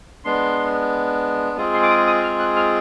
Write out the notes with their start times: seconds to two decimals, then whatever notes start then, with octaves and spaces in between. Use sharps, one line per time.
0.25 G#3 B3 D4 C6
1.57 G#3 C4 F4 G#4
1.74 C6
1.83 D6
1.90 D#6
2.07 D#6
2.23 F6
2.40 F#6
2.56 F6